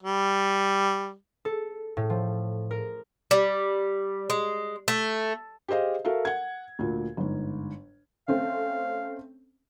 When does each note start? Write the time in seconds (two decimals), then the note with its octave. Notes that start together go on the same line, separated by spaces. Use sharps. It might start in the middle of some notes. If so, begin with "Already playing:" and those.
0.03 G3
1.45 A4
1.97 A2
2.10 F3
2.71 A#4
3.31 G3
4.30 G#3
4.88 A3
5.68 G4 G#4 C5 D#5 F5
6.05 F#4 A4 A#4 E5 F5
6.25 F#5 G#6
6.79 D2 A#2
7.17 G1 G#2
8.28 A3 C4 C#4 F5